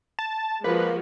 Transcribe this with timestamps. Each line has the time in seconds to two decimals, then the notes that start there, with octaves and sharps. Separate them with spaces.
0.19 A5
0.64 F3 G#3 A#3 F#4 B4